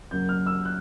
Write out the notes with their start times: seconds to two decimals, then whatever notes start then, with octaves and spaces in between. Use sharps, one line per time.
0.11 F#2 C#3 F#3 A#3 G6
0.29 F6
0.46 E6
0.65 F#6